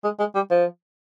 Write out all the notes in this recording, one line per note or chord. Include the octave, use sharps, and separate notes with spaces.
G#3
G#3
G3
F3